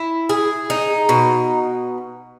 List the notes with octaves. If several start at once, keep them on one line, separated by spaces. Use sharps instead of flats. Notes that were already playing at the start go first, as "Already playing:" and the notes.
Already playing: E4
G#4
D#4
B2